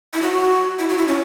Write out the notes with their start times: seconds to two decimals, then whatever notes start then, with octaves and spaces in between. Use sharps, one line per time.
0.14 E4
0.22 F#4
0.79 E4
0.89 F#4
0.98 E4
1.08 C#4